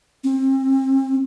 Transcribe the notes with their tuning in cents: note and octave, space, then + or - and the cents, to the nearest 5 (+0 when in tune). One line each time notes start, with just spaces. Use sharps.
C4 +35